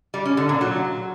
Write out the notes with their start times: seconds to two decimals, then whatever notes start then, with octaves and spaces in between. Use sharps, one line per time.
0.14 G3
0.26 C#4
0.37 D3
0.49 A#2
0.61 F#3